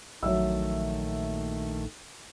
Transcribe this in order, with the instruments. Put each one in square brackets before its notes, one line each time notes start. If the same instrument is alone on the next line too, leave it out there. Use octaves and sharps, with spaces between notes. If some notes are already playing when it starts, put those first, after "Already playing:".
[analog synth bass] A#1 [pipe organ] D#3 A3 [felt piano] F#3 E5 E6